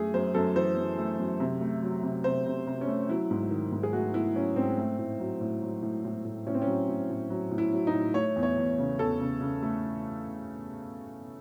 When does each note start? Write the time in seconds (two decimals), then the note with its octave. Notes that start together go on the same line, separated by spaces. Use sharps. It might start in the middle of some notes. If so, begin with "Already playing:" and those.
Already playing: F#2 A3 G#4
0.14 F#2 C5
0.35 F#2 A4
0.55 E3 C5
0.77 F#2
0.99 A3
1.19 F#2
1.40 C3
1.61 A3
1.83 F#3
2.03 C3
2.24 C3 C5
2.46 C3
2.67 C3
2.81 C#4
2.87 A3
3.09 F#3 E4
3.31 G#2
3.51 D#3
3.72 G#2
3.83 G#4
3.93 A3 F#4
4.14 A3 E4
4.36 F#3 C#4
4.56 G#2 C4
4.78 A3
4.98 A2
5.20 F#3
5.41 A2
5.62 F#3
5.82 A2
6.05 A2
6.25 A2
6.46 A2 C#4
6.54 C4
6.62 C#4
6.67 F#3
6.89 A2
7.10 A2
7.30 F#3
7.51 A2
7.58 E4
7.72 F#3
7.87 D#4
7.93 A2
8.14 A3 C#5
8.36 E2
8.43 C#5
8.57 E2
8.79 C#3
8.99 E2 A4
9.20 C#3
9.41 C#3
9.63 A3